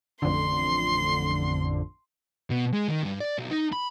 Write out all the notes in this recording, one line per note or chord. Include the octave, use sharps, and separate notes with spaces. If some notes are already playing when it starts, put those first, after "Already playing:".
A1 F2 D3 C6
B2
G#3
D#3
G2
D5
B1
D#4
B5